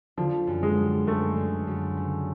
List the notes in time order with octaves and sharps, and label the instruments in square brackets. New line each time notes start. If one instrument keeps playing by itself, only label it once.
[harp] D3 [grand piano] F3
[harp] F#2
[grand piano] G#3
[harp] G3
[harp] F#2 [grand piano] A3
[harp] D3
F#2
C#3